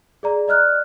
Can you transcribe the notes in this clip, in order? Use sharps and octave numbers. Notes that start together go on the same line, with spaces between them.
G#4 D5 A#5
D5 D#5 F6 F#6